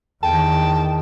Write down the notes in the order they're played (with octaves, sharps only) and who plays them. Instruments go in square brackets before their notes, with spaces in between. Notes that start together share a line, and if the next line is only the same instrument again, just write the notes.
[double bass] E2 D#3 [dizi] G5 [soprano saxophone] A5